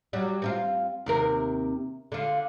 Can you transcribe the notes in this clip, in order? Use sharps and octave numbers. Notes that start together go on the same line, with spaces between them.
F#3 G3
C4 D#4 F4
D#2 C3 A#4
D3 F4